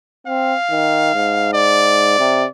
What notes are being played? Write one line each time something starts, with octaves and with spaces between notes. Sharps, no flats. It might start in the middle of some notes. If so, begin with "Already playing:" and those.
C4 F5
D#3
G#2
D5
C3